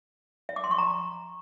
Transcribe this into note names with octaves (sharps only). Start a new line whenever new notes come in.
E5
D6
C6
C#6
A#5